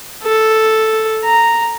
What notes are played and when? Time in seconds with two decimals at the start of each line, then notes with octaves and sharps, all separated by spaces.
0.23 A4
1.24 A#5